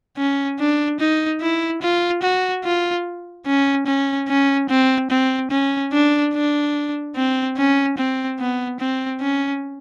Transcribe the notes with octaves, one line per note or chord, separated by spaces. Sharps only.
C#4
D4
D#4
E4
F4
F#4
F4
C#4
C#4
C#4
C4
C4
C#4
D4
D4
C4
C#4
C4
B3
C4
C#4